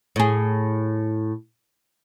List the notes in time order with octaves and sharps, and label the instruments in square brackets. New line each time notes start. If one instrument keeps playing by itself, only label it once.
[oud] A2 G#4